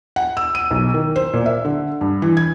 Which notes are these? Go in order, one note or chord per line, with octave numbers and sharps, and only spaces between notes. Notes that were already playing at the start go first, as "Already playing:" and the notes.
F#5
E6
D#7
B1
D#3
C5
A#2
E5
D3
G2
E3
G#6